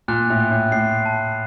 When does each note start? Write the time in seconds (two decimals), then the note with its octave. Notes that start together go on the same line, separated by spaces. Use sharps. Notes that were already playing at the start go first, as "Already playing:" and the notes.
0.08 A#2 F#6
0.30 A2
0.40 F#6
0.51 A2
0.72 A2 C7
1.05 A5